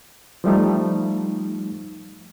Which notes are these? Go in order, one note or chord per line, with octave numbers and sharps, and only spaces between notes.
F3 G3 A3 D#4